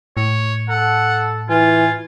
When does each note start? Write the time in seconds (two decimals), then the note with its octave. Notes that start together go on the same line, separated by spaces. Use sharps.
0.17 A2 C#5
0.69 A4 F#5
1.49 E3 F4 G#5